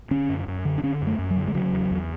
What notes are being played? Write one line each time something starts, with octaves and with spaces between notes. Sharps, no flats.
D3 C#4
F#2
F#2
D3
D4
D3 C#4
F#2
A3
F#2
F#3
D3
G#3
C#3 F#3
E2
E2